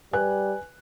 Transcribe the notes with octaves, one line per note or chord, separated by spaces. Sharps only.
G3 B4 G#5 F#6